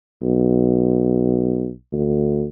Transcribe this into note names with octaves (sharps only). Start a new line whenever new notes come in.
B1
D2